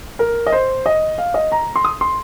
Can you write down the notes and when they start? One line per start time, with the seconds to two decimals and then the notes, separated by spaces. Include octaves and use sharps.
0.19 A#4
0.46 D#5
0.52 C5
0.86 D#5
1.18 F5
1.34 D#5
1.52 A#5
1.76 C6
1.84 D#6
2.01 C6